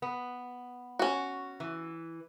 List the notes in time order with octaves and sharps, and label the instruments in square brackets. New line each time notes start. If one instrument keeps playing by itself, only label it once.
[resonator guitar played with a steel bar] B3
[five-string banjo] C#4 F#4
[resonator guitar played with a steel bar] E3